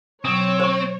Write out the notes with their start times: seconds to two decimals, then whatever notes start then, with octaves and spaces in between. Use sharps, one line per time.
0.25 B2 F#3 C4 C#5
0.60 C5 C#6